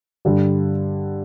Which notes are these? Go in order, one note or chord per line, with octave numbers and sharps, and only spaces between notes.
G2 D3 G3